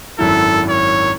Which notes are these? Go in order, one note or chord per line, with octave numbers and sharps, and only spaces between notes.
G#1 F#2 E4 A4
C#5